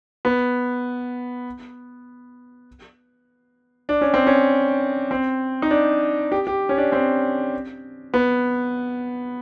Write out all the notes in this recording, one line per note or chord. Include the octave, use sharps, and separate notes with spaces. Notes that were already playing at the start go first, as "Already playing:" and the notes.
B3
D4
C#4
C4
C#4
C4
D#4
D4
G4
G4
C#4
D4
C4
B3